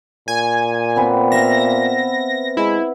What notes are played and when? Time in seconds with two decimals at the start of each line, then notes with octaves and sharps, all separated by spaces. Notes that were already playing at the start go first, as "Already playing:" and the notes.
0.28 A#2 G#5
0.96 B3 C4 B4
1.32 E5 F5 A#6
2.57 G#3 E4